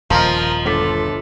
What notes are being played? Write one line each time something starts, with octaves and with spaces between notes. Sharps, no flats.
D#1 F3 A#4 D#5 A#5
G1 A4 D6 B6